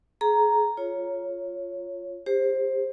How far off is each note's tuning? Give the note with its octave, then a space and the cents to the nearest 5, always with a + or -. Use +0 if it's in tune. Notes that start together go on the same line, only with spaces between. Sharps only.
G#4 +30 A#5 +0
F4 +0 C#5 +0
G4 +30 C5 +10